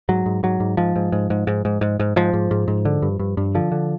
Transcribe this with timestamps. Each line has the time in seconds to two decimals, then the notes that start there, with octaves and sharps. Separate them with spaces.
0.09 G#2 F#3
0.26 G#2
0.43 G#2 F#3
0.60 G#2
0.77 G#2 F3
0.96 G#2
1.12 G#2
1.30 G#2
1.47 G#2
1.65 G#2
1.81 G#2
2.00 G#2
2.16 G#2 F3
2.33 G#2
2.51 G#2
2.68 G#2
2.85 D3
3.02 G2
3.19 G2
3.37 G2
3.55 D3 F3
3.72 D3